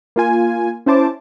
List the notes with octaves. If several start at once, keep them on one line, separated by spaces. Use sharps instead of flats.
A#3 F4 G#5
C#4 E4 C5 A5 D6